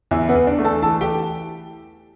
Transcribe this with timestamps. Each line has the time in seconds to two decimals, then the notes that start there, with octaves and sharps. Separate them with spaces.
0.11 E2 E4 E5
0.29 B3 B4
0.35 E2
0.47 D4 D5
0.59 A3
0.65 A4 A5
0.82 E3 A4 A5
1.01 G4 G5